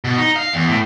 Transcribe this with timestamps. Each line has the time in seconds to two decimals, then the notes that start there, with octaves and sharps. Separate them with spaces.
0.04 B2
0.17 D#4
0.36 F5
0.54 E2
0.68 A2